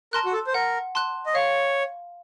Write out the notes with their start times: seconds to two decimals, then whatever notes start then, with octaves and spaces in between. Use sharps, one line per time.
0.13 A#4 A5 C6 F#6
0.25 F#4
0.33 A4
0.47 C5
0.54 A#4 F#5
0.95 A5 C6 F#6
1.26 D#5
1.34 C#5 F5